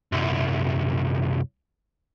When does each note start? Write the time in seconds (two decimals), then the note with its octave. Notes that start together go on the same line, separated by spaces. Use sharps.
0.12 C2 F#2